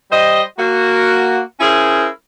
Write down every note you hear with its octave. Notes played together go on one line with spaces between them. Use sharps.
G3 C5 D#5
A#3 F#4
C#4 E4 G#4 A#4 C5